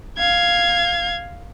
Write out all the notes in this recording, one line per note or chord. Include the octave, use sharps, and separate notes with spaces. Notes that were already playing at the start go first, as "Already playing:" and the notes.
F5 G#6